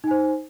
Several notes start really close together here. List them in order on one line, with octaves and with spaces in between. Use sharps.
D#4 G#5 C5